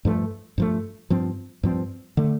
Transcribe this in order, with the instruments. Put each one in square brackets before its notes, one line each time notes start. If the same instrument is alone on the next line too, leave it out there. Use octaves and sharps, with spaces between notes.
[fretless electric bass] G2 F3 A3
G2 F3 A3
G2 F3 C4
G2 F3 C4
D3 A3